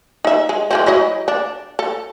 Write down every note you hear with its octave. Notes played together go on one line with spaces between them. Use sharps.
D#4 E5
G#3
E3 G#3 C4
F#3 E4 D#5
D4
A4